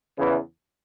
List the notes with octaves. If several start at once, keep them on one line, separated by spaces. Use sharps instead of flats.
E2 C#3 E3